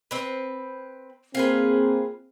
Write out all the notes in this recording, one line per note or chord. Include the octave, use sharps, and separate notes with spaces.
C4 B4
A#3 C4 F4 G#4 B4